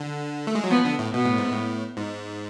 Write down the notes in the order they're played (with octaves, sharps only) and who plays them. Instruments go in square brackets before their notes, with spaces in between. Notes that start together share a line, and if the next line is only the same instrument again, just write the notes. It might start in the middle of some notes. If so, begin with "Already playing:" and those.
Already playing: [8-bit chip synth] D3
A3
G#3
F#3
[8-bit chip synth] F3 [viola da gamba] B3
[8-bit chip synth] D3
A2
[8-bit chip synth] B2 [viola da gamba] B3
[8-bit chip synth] A2
G#2
A2
G#2